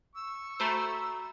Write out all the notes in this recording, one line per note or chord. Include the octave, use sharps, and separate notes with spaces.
C#6 E6
A3 F#4 C5 A#5 B5